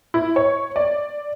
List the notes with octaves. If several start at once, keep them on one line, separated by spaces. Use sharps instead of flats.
E4
C#5
D5